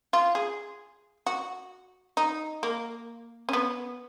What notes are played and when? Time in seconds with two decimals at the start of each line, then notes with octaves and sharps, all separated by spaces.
0.13 F4
0.35 G#4
1.27 F#4
2.17 D#4
2.63 A#3
3.49 C#4
3.53 B3